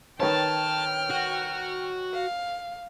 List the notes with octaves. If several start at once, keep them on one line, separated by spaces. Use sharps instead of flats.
D#3 B4 C#5 G5 A5 F6
F#4
F5